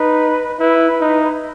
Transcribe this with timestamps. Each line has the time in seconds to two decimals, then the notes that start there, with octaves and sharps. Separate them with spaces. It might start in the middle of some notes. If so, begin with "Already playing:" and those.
Already playing: D#4 B4
0.59 E4 B4
1.01 D#4